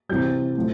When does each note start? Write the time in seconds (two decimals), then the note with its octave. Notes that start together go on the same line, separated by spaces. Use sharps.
0.09 C3 E3 G3 G6
0.57 A2 F3